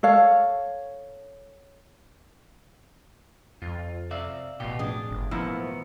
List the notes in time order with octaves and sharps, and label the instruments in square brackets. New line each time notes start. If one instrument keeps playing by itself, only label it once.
[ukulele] A4 C#5 F5
[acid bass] F2 [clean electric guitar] F4
[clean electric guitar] C3 D5 E5 [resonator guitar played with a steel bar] F5
[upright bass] A1 E3 [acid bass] B2 [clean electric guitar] F4 G4
[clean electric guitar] F2 [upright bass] A2 [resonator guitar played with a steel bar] D4 G#4
[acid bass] G1
[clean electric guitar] E2 B2 B3 [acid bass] F3 [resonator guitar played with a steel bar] A#3 E4